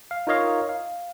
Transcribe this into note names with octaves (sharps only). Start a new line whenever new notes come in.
F5
D#4 F4 A#4 C#5 D#5 F5
F5